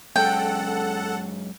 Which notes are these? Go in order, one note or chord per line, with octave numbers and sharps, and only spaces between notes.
F#2 G#3 C#4 A4 F#5 G5